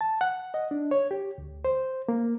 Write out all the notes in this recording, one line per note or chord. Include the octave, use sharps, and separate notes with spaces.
A5
F#5
D#5
D4
C#5
G4
D2
C5
A#3